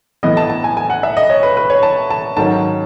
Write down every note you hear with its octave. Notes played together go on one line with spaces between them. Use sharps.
A2 E3 B3 E4 D#5
A5
A5
G#5
G#5
F#5
E5
D#5
C#5
B4
B4
C#5
A5
A5
G#2 D#3 F#3 C#4 A5